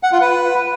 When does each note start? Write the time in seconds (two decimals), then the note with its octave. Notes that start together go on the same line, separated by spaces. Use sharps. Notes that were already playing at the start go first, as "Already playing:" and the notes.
0.03 F#5
0.12 F4
0.21 B4